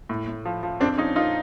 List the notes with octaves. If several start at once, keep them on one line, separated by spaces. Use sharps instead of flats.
A2
A2
F3
F3
F2 C4 D4
F3 C#4 D#4
F2 D#4 F4